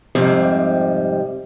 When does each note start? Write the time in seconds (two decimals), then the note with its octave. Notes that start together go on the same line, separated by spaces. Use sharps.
0.15 F2 G#2 C3 F3 G3